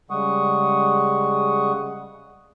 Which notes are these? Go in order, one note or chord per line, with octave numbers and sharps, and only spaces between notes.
C#3 G3 G#3 F#5 C#6 D#6